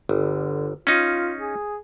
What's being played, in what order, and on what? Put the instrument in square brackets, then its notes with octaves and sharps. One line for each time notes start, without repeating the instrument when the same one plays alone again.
[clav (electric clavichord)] G1 [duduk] D3
[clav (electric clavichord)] C#4 D#4 [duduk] F4
[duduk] G#4